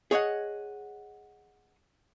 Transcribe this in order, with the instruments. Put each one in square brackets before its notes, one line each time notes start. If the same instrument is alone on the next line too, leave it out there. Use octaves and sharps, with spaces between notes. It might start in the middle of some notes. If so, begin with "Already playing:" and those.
[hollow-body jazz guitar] G#4 C#5 D#5 F#5